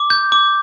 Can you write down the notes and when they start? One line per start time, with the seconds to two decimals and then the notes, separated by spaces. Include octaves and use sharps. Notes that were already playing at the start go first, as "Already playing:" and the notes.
Already playing: D6
0.10 G6
0.32 D6